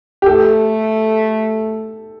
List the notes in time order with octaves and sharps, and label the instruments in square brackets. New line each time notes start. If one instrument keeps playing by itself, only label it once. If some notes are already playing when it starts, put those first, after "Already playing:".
[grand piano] G4
[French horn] A3 [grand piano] A4